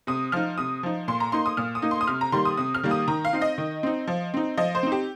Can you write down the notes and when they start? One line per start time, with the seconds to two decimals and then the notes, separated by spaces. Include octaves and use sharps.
0.07 C3 D#6
0.32 F3 D#4 F6
0.58 C3 D#6
0.83 F3 D#4
1.08 A#2 C6
1.20 A#5
1.32 A#3 D#4 C6
1.46 D#6
1.57 A#2 F6
1.75 D#6
1.82 A#3 D#4
1.91 C6
2.01 D#6
2.07 C3 F6
2.21 A#5
2.32 D#3 G3 A#3 C6
2.45 D#6
2.57 C3 D#6
2.75 F6
2.83 D#3 G3 A#3
2.91 D#6
3.08 D#3 A#5
3.25 F5
3.33 C4 D#4
3.42 D#5
3.58 D#3
3.83 C4 D#4
4.07 F3
4.34 C4 D#4
4.57 F3 D#5
4.75 C5
4.83 C4 D#4
4.92 G4